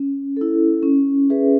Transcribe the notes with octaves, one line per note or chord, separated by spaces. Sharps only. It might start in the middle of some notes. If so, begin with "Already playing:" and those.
Already playing: C#4
E4 A4
C#4
G#4 B4 E5